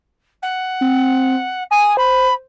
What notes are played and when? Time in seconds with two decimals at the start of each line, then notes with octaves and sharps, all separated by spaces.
0.42 F#5
0.81 C4
1.71 G#5 D#6
1.97 C5 B5